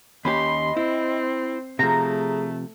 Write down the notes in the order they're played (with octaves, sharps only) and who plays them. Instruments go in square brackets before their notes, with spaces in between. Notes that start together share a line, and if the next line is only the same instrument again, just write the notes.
[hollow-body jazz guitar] D#2 C#4 G4 [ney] D#5 [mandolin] B5 [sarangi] C6
[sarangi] C4 [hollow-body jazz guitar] E4
[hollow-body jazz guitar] C3 F3 [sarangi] A3 [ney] G#4 [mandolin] A#5